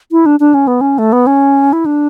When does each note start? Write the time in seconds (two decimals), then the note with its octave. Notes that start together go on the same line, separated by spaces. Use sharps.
0.12 E4
0.26 D4
0.40 D4
0.54 C#4
0.67 B3
0.81 C#4
0.98 A3
1.13 B3
1.27 C#4
1.73 E4
1.86 D4